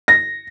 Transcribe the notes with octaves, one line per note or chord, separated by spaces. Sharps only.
A#6